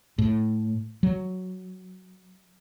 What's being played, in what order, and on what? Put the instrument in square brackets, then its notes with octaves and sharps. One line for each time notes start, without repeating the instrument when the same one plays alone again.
[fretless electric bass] A2
F#3